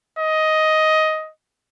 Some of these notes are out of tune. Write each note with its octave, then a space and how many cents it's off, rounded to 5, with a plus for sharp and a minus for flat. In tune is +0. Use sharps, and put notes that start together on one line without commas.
D#5 +10